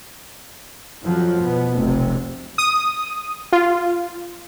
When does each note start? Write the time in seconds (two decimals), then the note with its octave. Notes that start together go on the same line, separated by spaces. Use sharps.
1.05 F2 F3 F#3
1.43 B2 B3
1.77 F1 B1 C3
2.58 D#6
3.52 F4